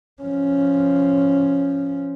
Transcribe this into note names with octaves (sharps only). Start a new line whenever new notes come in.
F3 C#4